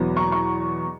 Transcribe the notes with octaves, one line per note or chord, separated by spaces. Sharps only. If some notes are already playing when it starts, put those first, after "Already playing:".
Already playing: E2 B2 F#3 B3
A#5 C#6
A#5 C#6